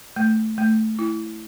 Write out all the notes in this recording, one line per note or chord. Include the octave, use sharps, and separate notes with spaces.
A3
A3
E4